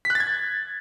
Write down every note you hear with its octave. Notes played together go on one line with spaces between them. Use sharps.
B6
F#6
A6
G#6